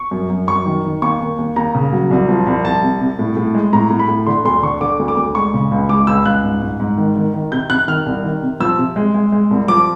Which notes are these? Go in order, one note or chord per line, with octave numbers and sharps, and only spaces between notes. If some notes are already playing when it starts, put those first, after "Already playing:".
Already playing: C#6
F#2
F#2
F#2 C#6
D#3
D#3
D#2 C#6
D#2
D#2
D#2 A#5
C#3
F#3
C2
F3
C2
C2 A5
C3
C3
A2
A2
G#3
A2 A#5
A2
B5
A2
D3 C6
D2 C6
D3 C#6
D3 D6
D2
D6
D2
G#3 C#6
C#3
C#2
G#3 D6
C#2 E6
C#2 F#6
G#2
G#2
G#2
D#3
D#3
D#3
C3 G6
C3 F#6
D#3 F6
C2
D#3
C3
F3 E6
C3
G#3
G#3
G#3
C2
F3 D6